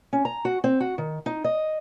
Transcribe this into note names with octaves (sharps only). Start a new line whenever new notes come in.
C#4
A#5
F#4
C4
F#4
D#3
D#4
D#5